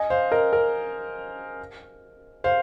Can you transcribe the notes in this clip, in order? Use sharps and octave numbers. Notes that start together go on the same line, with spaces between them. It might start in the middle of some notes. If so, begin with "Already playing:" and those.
Already playing: D#5 G#5
C5 F5
A#4 D#5
A#4
C5 F5